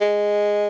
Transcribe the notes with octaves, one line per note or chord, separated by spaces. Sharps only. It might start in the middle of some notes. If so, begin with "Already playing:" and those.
G#3